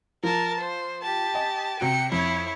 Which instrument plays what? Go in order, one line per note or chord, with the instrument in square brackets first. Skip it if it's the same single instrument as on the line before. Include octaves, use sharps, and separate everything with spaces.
[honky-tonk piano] F3 [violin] A#4 A5
[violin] C5
G4 A5
[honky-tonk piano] D#5 G#5
[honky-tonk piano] C3 F#4 D7 [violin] G5 C#7
[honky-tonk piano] F2 [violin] E4 C#5